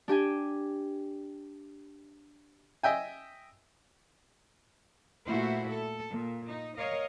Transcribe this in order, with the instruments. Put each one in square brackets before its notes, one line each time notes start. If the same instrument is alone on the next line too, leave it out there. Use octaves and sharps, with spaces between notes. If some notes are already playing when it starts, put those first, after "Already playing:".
[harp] D4 G4 G5 G#5
[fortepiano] D#5 E5 G5 G#5
[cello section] A#2 A3 E4 F#4 C5
A4
A#2
D#4
A#4 C#5 D#5 F5